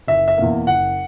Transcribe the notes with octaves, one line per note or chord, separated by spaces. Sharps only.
F#1 E5
E5
E2 B2 A#3
F#1 F#5